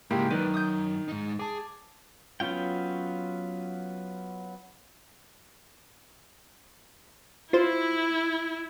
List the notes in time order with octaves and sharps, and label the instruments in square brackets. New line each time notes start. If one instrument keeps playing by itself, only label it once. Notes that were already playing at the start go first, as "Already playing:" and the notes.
[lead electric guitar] G#2 C#3 [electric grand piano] G#3 A#3 E4 [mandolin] G4 G5
[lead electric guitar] F#2 [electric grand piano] D#3 [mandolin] B4 D5
[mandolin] D#6 G6
[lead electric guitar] G#2 D#4
[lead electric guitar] G#4 [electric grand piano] A5 D6
[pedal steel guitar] F#3 B3 C#4 F4 G5
[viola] E4 [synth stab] F4 C5